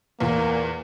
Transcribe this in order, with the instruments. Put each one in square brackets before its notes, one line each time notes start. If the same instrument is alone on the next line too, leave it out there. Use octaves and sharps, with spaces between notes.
[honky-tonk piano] E2 A#2 [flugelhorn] A#3